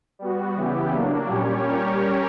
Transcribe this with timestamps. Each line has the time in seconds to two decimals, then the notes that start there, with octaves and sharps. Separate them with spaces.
0.19 G3 B3 F#4
0.56 C#3 E3 B3 E4 G4
0.92 F#3 A#3 D4
1.29 A#2 G3 C#4 G4 C#5
1.66 G3 C#4 G4 A#4 C#5